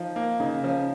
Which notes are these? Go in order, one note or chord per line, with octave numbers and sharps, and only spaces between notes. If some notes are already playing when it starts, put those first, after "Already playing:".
Already playing: F3 D#4 F4
A#3
C#3 D#4
F3 C#4